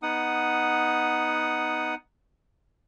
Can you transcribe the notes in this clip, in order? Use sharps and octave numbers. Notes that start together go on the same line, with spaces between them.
B3 D#4 F#5 D#6